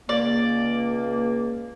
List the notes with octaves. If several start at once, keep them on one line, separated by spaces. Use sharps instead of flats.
C#2 A#3 D5